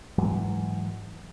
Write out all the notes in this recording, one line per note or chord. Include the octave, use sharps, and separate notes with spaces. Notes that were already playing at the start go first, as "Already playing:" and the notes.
G#2 E3 F#3 G#3